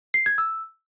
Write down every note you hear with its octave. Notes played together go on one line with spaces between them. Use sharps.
C7
G#6
E6